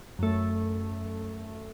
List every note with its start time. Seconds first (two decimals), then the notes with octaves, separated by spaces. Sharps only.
0.19 F#2 A3